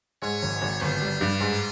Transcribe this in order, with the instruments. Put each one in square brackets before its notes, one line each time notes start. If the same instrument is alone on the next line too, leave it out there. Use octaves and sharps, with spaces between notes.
[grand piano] G#2 [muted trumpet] C#5
[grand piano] G#1
G#1
[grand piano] G1 [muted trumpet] F4
[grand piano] G3
G2
G#2